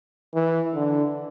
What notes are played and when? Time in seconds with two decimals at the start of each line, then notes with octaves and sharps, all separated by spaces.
0.34 E3
0.75 D3